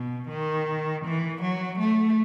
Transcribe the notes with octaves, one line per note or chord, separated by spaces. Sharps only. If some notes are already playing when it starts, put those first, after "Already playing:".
Already playing: B2
D#3
E3
F#3
A3